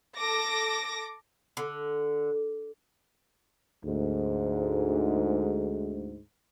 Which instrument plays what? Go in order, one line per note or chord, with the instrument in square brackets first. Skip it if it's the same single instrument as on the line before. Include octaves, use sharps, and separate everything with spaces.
[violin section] A4 D6 A#6
[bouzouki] D3
[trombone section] D2 G#2